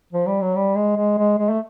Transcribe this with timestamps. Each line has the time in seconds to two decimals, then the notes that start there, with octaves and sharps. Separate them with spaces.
0.13 F3
0.27 G3
0.41 F#3
0.56 G3
0.75 G#3
0.96 G#3
1.18 G#3
1.38 G#3
1.50 A3